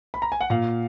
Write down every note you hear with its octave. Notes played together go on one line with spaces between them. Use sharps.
B5
A#5
G#5
F#5
A#2 F5